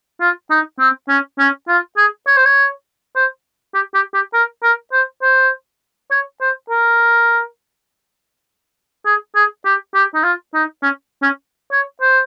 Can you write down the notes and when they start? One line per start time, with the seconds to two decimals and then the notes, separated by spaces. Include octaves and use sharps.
0.20 F4
0.50 D#4
0.79 C4
1.09 C#4
1.39 C#4
1.68 F4
1.97 G#4
2.27 C#5
2.37 C5
2.45 C#5
3.16 C5
3.74 G4
3.94 G4
4.14 G4
4.34 A#4
4.63 A#4
4.92 C5
5.22 C5
6.11 C#5
6.41 C5
6.70 A#4
9.06 G#4
9.35 G#4
9.65 G4
9.94 G4
10.14 D#4
10.23 F4
10.54 D#4
10.82 C#4
11.22 C#4
11.72 C#5
12.01 C5